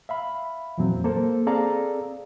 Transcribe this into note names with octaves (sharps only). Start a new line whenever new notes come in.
E5 F5 B5
F2 A#2 E3 F#3 C4
A#3 A4 C5
C4 G#4 A4 D5 F5 A#5